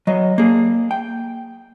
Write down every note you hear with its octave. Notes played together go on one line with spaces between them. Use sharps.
F#3 D#5
A#3 G#4
G5